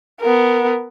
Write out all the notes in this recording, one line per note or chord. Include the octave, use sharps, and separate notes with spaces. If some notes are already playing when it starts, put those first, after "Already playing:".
B3 A#4